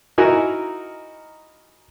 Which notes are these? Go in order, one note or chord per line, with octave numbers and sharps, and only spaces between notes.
D#4 E4 F#4 A#4 F#5 G#5